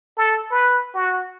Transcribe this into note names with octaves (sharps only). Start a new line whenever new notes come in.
A4
B4
F#4